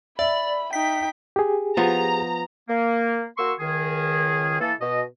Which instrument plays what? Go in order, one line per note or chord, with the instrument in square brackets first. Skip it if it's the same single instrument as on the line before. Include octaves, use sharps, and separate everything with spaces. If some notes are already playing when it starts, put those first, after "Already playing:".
[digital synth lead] D5 [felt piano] E5 [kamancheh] B5
[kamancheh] D#4 G5 [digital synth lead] B6
[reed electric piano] G4 G#4
[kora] F3 B3 [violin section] A#5
[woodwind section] A#3
A#3 F#4 C6 C#6 E6
C#2 D#3 G#4
E3 A#3 A4
B2 D#5